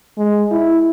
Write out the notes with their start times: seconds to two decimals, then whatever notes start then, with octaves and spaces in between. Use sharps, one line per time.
0.17 G#3
0.51 E4